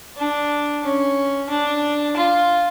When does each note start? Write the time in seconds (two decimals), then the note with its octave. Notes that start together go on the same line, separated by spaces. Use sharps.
0.17 D4
0.84 C#4
1.50 D4
2.17 F4